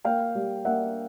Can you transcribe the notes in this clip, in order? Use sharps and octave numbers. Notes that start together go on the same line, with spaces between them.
A#3 F5 G5
G3
A#3 E5 F#5